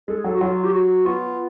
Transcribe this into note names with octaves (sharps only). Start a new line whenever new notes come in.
G#3 A4
G#4
F#3 A4
F#4
F#3 F4
G4
F#4
B3 F4